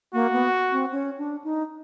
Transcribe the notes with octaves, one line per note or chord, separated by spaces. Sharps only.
A#3 F#4
B3
C4
C#4
D4
D#4